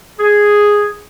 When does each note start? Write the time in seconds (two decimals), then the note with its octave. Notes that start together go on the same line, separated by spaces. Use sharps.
0.19 G#4